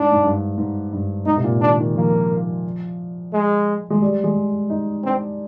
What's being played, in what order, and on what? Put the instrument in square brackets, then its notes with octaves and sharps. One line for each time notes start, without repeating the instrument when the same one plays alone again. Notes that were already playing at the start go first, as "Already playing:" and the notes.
Already playing: [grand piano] G#2 [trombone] D4
[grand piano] G#2
G2
G#2
G2
[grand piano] G#2 [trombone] D#4
[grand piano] C3
A#2
[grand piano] D#3 [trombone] D4
[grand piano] D#3
[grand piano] F3 [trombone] A#3
[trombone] G#3
[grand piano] G#3
G3
G#3
D#4
[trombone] C4 [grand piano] D4